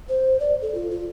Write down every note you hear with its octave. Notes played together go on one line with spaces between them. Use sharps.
C5
D5
A4
F4
F4